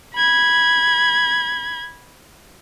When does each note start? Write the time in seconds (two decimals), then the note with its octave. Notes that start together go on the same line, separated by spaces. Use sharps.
0.15 B5 G#6